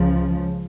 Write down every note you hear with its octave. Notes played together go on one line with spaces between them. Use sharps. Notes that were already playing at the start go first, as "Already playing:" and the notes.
Already playing: C#2 C#3 F3